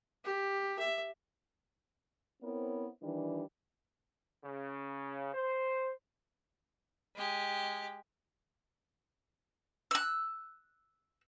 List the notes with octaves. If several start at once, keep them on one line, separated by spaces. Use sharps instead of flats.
G4
E5
B3 C4 E4 A#4 C5 C#5
D#3 E3 G3 D4
C#3
C5
G#3 G4
E6 F#6